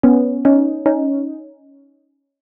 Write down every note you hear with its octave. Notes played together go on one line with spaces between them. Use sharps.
B3 C#4
C#4 D#4
C#4 D#4